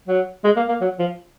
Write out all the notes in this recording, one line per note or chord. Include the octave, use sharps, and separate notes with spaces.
F#3
G#3
A#3
A#3
F#3
F3